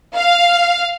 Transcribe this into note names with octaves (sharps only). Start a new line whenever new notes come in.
F5